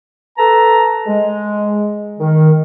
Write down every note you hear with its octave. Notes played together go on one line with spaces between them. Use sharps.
A4 B4 A5 A#5
G#3
D#3